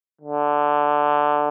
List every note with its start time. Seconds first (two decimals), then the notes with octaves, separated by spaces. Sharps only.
0.21 D3